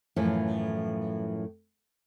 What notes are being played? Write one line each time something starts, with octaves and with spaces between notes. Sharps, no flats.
F#2 A2 E3 F3